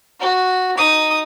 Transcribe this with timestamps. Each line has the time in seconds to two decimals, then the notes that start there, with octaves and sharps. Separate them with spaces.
0.20 F#4
0.77 D#4 D#6